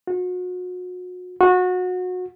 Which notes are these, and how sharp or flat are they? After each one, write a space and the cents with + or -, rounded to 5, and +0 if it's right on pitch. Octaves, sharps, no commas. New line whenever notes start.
F#4 -35
F#4 -25